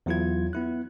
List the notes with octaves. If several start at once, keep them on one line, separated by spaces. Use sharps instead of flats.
E2 F#3 E4 F4 G#6
B3 E4 F#6